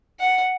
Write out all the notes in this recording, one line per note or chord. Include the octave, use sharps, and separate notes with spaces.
F#5